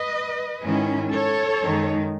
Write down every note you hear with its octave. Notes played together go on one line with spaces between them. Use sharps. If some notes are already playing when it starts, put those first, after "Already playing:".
Already playing: B4 D#5
G#2 D#3 G#3 C#4 E4
A4 C#5
F#2 D#3 G#3 D#4